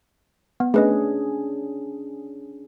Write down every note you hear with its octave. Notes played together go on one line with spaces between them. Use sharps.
B3
A3 C#4 D4 G#4 B4 D#5